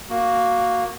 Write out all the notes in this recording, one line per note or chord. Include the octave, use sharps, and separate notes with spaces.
A#3 F#4